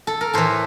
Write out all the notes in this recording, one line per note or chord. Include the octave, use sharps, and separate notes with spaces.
A4
A#4
A2 E3 A4 C5